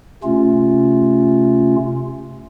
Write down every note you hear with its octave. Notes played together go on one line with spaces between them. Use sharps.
C3 A3 C#4 F4